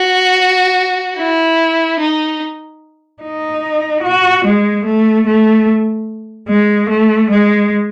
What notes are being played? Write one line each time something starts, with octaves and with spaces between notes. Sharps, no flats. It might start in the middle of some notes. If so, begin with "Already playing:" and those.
Already playing: F#4
E4
D#4
D#4
F#4
G#3
A3
A3
G#3
A3
G#3